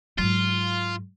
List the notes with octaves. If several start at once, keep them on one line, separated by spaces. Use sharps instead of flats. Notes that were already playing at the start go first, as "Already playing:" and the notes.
G#2 F#3 F4